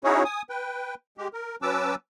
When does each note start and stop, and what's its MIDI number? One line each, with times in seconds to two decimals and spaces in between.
0.04 0.24 61
0.04 0.24 63
0.04 0.24 64
0.04 0.24 66
0.04 0.24 68
0.04 0.24 73
0.24 0.42 80
0.24 0.42 87
0.49 0.95 71
0.49 0.95 79
1.18 1.28 56
1.18 1.28 67
1.33 1.56 70
1.62 1.95 54
1.62 1.95 61
1.62 1.95 71
1.62 1.95 81
1.62 1.95 86
1.62 1.95 88